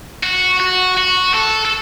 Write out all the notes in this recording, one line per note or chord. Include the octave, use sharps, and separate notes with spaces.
F#4
F#4
F#4
A4
A4